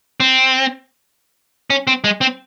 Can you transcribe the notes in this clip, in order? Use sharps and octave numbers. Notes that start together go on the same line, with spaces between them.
C4
C#4
C4
G#3
C4